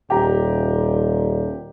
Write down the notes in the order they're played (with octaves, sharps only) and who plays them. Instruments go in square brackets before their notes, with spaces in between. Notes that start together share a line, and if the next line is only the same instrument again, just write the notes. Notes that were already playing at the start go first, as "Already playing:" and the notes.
[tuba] D#1 [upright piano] G4 A#5